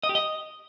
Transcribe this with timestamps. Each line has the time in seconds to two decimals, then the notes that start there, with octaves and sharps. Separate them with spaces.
0.03 D#5
0.09 G4
0.15 D#5